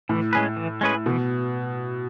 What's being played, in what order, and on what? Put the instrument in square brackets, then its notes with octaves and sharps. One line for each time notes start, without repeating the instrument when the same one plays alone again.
[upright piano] A2 [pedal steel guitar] E3
[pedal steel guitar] G#3 C#4 G#4 B4
E3
G#3 C#4 G#4 B4
[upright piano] B2 [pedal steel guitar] E3